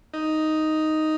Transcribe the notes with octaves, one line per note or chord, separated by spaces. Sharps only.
D#4